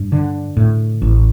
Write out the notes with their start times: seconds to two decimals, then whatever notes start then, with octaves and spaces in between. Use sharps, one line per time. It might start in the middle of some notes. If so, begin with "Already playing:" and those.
Already playing: G2
0.12 D3
0.57 A2
1.02 A1